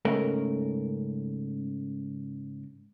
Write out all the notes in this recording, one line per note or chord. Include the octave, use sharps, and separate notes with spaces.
G#2 C#3 A3 A#4